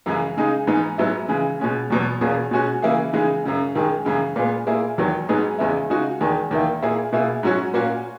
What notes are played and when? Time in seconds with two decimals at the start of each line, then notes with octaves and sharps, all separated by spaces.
0.06 F#2 C#3 E3 G#3
0.37 C#3 G#3 D#4 G#4
0.67 G#2 E3 B3 D#4 G#4
0.98 G#2 F#3 B3 E4
1.29 C#3 E3 G#3
1.60 B2 G#3 C#4
1.90 E2 B2 F#3 B3
2.21 E2 B2 A#3 C#4 G#4
2.51 B2 G#3 C#4 F#4
2.82 C#3 E3 A#3 E4 G#4
3.13 C#3 E3 G#3 D#4 G#4
3.44 F#2 C#3 G#3
3.75 F#2 D#3 G#3
4.05 F#2 C#3 E3 G#3
4.36 A#2 G#3 B3
4.67 A#2 A#3 E4 G#4
4.98 E2 D#3 F#3 B3
5.29 G#2 F#3 B3 D#4 G#4
5.58 E2 C#3 G#3 B3 E4
5.90 C#3 G#3 D#4 F#4
6.21 E2 D#3 G#3
6.51 E2 D#3 A#3 E4
6.82 A#2 A#3 E4 G#4
7.13 B2 A#3 E4 G#4
7.43 G#2 F#3 C#4 F#4
7.74 A#2 A#3 C#4 F#4